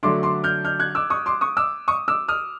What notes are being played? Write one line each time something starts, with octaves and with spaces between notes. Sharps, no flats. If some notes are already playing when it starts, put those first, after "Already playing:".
D3 F#3 A3 D4 C6 D6
C6 D6
F6 G6
F6 G6
F#6 G#6
D6 E6
C#6 D#6
C6 D6
C#6 D#6
D6 E6
C#6 D#6
D6 E6
D#6 F6